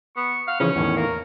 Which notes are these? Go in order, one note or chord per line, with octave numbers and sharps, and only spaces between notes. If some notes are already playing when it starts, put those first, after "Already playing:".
B3 C#6
F5 F#5
C#3 E3 F3 C#4 C#5
E2 A2 D#3
A#3 A#4